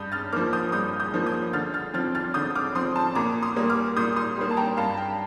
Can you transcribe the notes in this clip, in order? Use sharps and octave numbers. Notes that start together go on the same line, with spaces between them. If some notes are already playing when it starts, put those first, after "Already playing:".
Already playing: G2 D#6 G6
F6 A6
F3 A#3 D6 F6
D#6 G6
G2 D#6 G6
D#6 G6
F3 A#3
D#6 G6
D3 F6 A6
F6 A6
F3 C4 F6 A6
F6 A6
D3 D#6 G6
D6 F6
F3 C4 C6 D#6
A5 C6
A#2 A#5 D6
C6 D#6
G3 A#3
D6 F6
A#2 D#6 G6
C6 D#6
G3 A#3
A5
G5 A#5
G2 F5 A5
G5